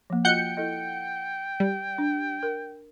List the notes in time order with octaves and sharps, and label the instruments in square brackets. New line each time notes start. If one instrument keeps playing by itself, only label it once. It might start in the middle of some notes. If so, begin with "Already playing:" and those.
[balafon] F3 A#3
[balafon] F4 F#4 D#5 [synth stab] F#5 G6 C#7 [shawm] G5
[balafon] E4 A4 D#5
[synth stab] G3
[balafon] D4
A#4